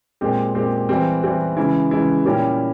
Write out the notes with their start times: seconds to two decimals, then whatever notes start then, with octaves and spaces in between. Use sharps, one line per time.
0.21 A#2 G#3 C4 G4
0.55 A#2 G#3 C4 G4
0.89 E3 G3 C4
1.23 E3 G3 C4
1.57 C#3 E3 G#3 E4
1.91 C#3 E3 G#3 E4
2.26 A#2 G3 C#4 E4 G4